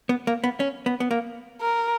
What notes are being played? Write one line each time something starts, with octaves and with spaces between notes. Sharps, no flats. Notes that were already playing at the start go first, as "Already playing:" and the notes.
B3
A#3
B3
C#4
B3
B3
A#3
A#4